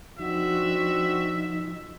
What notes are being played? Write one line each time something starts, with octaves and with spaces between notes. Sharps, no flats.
F3 C4 D4 D#4 F#4 E5